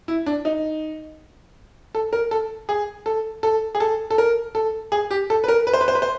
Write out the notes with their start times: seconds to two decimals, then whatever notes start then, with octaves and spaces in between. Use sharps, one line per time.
0.08 E4
0.26 D4
0.45 D#4
1.95 A4
2.13 A#4
2.31 A4
2.69 G#4
3.06 A4
3.43 A4
3.75 G#4
3.80 A4
4.10 A4
4.18 A#4
4.55 A4
4.92 G#4
5.11 G4
5.30 A4
5.44 B4
5.48 A#4
5.67 B4
5.73 C5
5.81 B4
5.88 C5
5.95 B4
6.02 C5